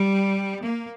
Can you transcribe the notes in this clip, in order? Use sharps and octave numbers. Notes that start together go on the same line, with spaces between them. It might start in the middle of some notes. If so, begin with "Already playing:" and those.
Already playing: G3
A#3